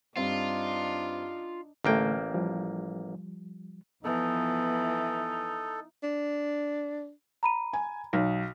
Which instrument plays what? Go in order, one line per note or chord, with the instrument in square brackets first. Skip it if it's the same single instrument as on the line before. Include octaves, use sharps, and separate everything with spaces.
[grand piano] G2 C4 [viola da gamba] D4 D#4 [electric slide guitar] F4
[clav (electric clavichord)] A1 A#3 G5 [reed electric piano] D3 A3
[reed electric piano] F3 G3
[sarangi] E3 [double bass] F3 B3 [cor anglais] D#4 [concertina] A4
[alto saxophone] D4
[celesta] A#5 B5 D#7
[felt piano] G#5
B1